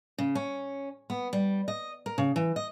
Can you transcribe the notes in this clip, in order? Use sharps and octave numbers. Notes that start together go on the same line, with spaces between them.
C#3
C#4
B3
G3
D#5
A#4
C#3
E3
D#5